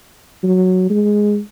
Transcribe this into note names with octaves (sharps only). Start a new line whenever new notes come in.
F#3
G#3